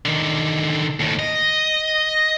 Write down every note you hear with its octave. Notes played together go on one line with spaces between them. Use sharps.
D3 D#3
D#2 A2
D#5